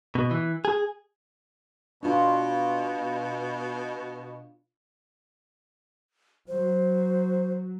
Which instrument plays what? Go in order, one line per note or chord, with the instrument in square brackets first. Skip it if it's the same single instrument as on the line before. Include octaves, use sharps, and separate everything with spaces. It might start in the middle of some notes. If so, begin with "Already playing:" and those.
[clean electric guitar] B2
E3
G#4
[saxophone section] B2 [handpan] D4 F4
[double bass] F#3 [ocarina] C5